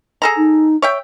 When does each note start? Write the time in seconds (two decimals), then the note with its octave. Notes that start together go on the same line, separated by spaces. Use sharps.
0.22 G#4 A4 A#5
0.37 D#4
0.82 C#5 E5 G5